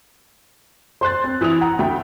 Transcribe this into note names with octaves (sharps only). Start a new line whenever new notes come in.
C5 C6 F#6 A6
C4
E3 E4 D#6 F7
F#5 A#5
D2 E5 G5